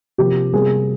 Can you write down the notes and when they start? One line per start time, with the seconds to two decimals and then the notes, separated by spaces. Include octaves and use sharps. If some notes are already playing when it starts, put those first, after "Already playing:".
0.18 C3 F3 A#3 G4
0.53 C3 G3 A#3 G#4